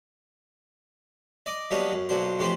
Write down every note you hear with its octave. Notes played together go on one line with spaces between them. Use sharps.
D5 D#5 D6
F#3 G3 A#3 B3 D4 D#4
F#2
B1 A#2 F#3 D4 C5
F2 A2 E3 G4 C5 C6